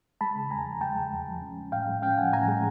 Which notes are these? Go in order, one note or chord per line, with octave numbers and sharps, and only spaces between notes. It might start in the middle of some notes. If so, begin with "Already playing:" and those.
G#3 A5 B5
C#3
E2 G#5 A#5
F3
G#3 G5 A5
C#3
E2
F3
C#4
F3
A2 F5 G5
G#3
C#4 F5 G5
F3 F#5 G#5
A2 G#5 A#5
G#3